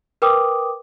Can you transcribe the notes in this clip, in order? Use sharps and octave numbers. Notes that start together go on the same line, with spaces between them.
A#4 B4 G5 D6 D#6